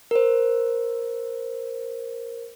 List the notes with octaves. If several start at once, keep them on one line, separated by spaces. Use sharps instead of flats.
A#4 C5